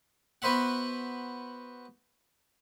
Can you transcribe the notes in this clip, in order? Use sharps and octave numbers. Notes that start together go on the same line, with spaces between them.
B3 F#4 B4 C5 E5 F#5